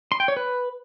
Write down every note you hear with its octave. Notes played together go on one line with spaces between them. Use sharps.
C6
G5
C#5
B4